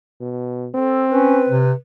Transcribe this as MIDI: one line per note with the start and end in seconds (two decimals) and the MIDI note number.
0.21 0.69 47
0.75 1.67 60
0.75 1.05 69
1.09 1.39 61
1.09 1.70 71
1.49 1.73 48